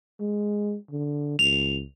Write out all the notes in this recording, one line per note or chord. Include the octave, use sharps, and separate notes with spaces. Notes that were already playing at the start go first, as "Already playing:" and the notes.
G#3
D3
C#2 F7